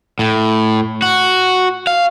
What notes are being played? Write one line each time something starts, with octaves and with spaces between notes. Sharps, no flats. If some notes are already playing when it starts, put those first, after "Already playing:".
A2
F#4
F5